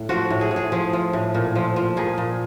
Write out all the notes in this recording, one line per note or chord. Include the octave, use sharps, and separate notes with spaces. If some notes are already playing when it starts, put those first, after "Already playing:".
Already playing: A2
F3 F#4
A2
G#4
A2
G#4
F3 G#4
F3
A2
A#2
F3
F3
A#2 G#4
A#2